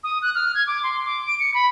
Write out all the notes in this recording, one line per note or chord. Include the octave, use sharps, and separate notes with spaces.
D#6
F#6
F6
G#6
D6
C6
D6
D7
C#7
B5